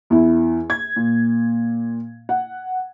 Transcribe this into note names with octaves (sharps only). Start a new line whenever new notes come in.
E2 E4
G#6
A#2
F#5